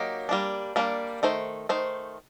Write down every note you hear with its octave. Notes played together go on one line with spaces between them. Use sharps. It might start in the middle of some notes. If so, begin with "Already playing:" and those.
Already playing: F#3 A#3 D#4 G4
G3 A#3 D4
G3 A#3 D4
D#3 A3 C5
D#3 A3 C5